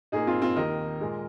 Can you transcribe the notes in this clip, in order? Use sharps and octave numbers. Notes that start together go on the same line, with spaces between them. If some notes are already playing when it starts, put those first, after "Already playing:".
A#2 A#3 D#4 G#4
C4 F4
C4 F4
D#2 D#3 A#3 A#4 D#5
A#2 G#3